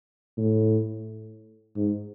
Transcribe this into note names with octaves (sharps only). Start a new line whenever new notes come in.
A2
G#2